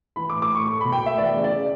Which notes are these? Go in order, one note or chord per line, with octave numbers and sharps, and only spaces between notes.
E3 B5
A2 D6
D6
A2 C#6
A3 C#6
B2 B5
G5
A3 E5
E3 D5
C#3
D5
C#3